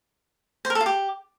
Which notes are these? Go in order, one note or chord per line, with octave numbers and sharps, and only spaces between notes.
C5
A#4
A4
F4
G4